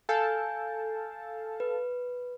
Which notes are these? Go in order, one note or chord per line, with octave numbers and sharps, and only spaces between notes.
A4 F5 G#5 A5 G6
B4